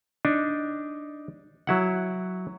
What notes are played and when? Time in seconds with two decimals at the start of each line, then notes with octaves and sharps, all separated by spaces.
0.25 D4 D#4
1.67 F#3 E4 F#5